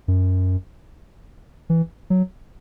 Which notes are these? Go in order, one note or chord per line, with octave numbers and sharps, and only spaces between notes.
F#2
E3
F#3